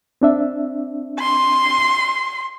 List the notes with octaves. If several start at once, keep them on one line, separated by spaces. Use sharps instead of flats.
C4 D4 E5
C6